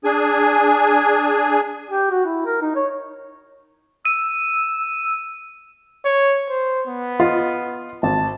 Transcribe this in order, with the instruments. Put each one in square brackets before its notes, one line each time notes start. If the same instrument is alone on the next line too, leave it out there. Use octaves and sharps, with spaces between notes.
[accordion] D4 G#4 G#5
[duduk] G4
F#4
E4
A#4
D#4
C#5
[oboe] E6 [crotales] D#7
[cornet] C#5
C5
B3
[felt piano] F4 D#5
[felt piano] G#1 [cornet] A5